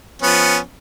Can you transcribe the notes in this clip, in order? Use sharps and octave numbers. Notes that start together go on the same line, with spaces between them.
F3 B3 C#4